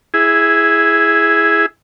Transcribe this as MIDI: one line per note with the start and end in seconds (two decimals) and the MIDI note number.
0.14 1.66 64
0.14 1.66 68